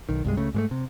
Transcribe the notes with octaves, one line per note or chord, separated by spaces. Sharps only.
B1 D#3
C2 G2 G#3
C#2 C#3 A3
G#2 G#3 A3
C3